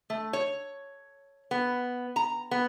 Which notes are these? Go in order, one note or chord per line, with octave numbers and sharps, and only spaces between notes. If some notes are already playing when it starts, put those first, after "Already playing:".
A3
C#5
B3
A#5
B3